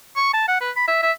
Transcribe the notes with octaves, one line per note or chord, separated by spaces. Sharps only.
C#6
A5
F#5
B4
B5
E5
E5